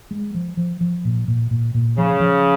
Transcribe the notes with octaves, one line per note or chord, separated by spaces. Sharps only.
G#3
F3
F3
F3
A#2
A#2
A#2
A#2
C#3 F3
F3